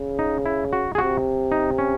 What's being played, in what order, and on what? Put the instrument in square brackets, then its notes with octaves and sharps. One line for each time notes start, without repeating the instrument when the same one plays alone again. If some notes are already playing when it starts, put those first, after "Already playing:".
Already playing: [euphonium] C#3
[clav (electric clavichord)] D#4
E4
F#4
G#4
[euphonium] C3 [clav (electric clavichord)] F#4
[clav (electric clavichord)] D#4
C#4